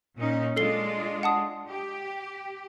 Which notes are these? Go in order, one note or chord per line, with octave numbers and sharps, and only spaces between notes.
A#2 C#4 D#4
G#3 D4 F4 A4 C7 G7
F#5 A5 D#6
G4